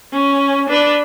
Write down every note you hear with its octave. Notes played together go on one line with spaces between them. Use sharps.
C#4
D4 B4